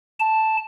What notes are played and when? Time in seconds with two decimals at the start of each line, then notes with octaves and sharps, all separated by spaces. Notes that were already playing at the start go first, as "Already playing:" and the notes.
0.20 A5